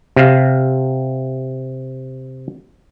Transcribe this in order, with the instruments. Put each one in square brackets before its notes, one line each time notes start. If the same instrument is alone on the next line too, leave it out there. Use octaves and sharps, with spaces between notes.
[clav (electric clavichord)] C3 F5